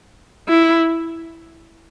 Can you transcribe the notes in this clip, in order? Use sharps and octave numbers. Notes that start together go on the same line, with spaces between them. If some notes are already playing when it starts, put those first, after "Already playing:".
E4